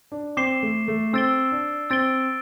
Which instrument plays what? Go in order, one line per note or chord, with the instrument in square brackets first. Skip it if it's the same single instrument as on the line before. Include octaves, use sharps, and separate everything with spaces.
[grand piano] D4
[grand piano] C4 [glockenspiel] D6 C7 E7 G7
[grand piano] A3
A3
[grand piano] C4 [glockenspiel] E6 A6 D7 G7
[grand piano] D4
[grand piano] C4 [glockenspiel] E6 A6 D7 G7